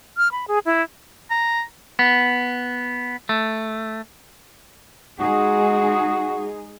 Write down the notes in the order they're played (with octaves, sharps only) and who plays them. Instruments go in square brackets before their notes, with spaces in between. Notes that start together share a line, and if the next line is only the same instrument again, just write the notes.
[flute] F6
B5
G#4
E4
[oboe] A#5
[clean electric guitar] B3
A3
[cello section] G#3 D#4 G#4 [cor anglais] F#4